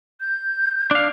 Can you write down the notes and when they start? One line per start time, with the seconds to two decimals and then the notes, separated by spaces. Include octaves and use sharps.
0.20 G6
0.91 D4 F5